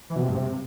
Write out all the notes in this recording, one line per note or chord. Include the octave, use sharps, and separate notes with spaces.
E3
B2
C3
G2
C3